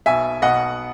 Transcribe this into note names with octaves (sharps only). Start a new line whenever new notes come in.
B1 B2 E5 G#5
B1 B2 D#5 F#5